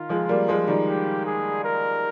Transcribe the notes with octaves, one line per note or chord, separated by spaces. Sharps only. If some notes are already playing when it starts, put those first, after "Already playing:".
Already playing: D#3 F4
F3 G#3
G3 A#3
F3 G#3
D#3 G3
G4
G#4
A#4